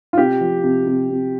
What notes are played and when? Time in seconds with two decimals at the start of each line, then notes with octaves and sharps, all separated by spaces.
0.13 F4
0.18 C3 G4
0.41 F3
0.64 C3
0.86 C3
1.10 C3